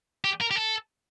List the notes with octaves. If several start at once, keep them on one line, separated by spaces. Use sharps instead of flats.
G4
A#4
G4
A4